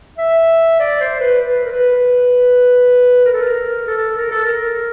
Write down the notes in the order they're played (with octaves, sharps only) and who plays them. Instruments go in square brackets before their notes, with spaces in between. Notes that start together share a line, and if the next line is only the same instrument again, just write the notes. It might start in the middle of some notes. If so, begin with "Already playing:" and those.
[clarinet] E5
D5
C5
B4
B4
A#4
B4
A#4
A4
A#4
A4
A#4
A4
A#4